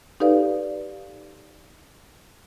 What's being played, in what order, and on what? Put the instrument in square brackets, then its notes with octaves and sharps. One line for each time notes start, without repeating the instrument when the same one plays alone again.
[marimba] D#4 G4 A4 B4 D5 F5